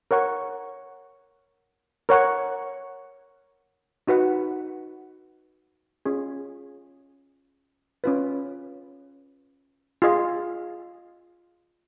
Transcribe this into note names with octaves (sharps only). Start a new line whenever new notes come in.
A#4 C#5 F#5 C#6
A#4 C#5 F#5 C#6
D#4 F#4 B4 F#5
C#4 F4 G#4
C#4 F4 B4
F4 G#4 D#5